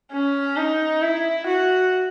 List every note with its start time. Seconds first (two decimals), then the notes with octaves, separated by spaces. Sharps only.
0.13 C#4
0.57 D#4
1.02 E4
1.47 F#4